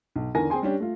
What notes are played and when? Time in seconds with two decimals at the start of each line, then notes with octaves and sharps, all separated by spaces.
0.16 B1
0.35 E2 D3 D#3 A#4 G#5 A#6
0.50 C4 G#4 G5 G#5 C6
0.62 G3 C#4 D4 G4
0.80 A3 F4